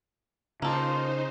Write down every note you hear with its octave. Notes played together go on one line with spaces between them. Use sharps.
C#3 A#3 D#4 F4 A4 C5